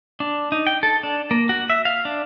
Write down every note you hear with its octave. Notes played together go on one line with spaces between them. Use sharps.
D4
D#4
G5
A4
D4
A#3
F#4
E5
F5
D4